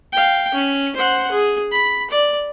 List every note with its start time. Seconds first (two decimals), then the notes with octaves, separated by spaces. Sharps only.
0.13 F5 G5
0.54 C#4
0.96 C5 F#5
1.32 G#4
1.72 B5
2.11 D5